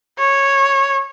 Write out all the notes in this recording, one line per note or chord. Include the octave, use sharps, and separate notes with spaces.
C#5